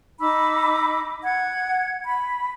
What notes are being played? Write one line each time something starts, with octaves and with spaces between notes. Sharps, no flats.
D#4 B5 D6 E6
F#5 G#6
B5